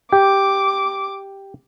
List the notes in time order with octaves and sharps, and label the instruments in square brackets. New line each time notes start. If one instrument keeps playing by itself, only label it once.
[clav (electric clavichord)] G4 [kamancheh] D6